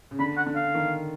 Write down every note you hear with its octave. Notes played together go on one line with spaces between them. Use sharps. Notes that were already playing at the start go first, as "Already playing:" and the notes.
C#3
D3 B5
F#5
D3
F5
D#3